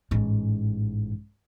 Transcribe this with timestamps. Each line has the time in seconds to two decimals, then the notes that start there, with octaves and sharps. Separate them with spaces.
0.11 A1 G#2